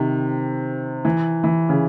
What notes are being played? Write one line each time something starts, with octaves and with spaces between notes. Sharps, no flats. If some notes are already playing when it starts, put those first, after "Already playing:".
Already playing: C3 D#3
E3
E3
C#3